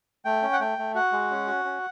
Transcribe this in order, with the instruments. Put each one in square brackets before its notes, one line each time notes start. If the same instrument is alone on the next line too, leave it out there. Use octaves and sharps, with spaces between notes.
[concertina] A3 G5
C#4
F#5
A3 G5
A3
F#4 F#5
G#3
C#4
F#4
C#4